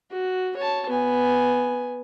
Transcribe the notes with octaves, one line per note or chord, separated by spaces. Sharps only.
F#4
C#5 A5
B3 G#5